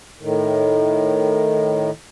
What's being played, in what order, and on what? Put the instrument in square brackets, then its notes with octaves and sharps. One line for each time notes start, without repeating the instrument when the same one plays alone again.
[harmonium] A2 D#3